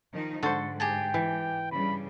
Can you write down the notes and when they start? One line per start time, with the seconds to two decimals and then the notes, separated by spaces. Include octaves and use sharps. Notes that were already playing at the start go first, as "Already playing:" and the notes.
0.12 D#3 F3 D#4
0.43 G#2 D3 A4 C5 C#6
0.80 G4 G#4 G5 A5
1.14 E3
1.72 G2 C#3 G3 B5